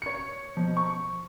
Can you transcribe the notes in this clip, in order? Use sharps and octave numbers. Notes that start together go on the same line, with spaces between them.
C#5 C#7
B2 F3
C#6